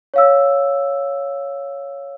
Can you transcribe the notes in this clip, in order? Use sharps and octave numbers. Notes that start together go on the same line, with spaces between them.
C#5 F5 E6